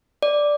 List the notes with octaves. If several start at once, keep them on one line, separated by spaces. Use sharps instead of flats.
D5